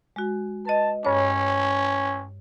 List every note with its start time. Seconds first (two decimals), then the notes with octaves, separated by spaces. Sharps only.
0.16 G#3 F#4
0.65 B4 D#5 A5
1.05 G2 C#4 C#5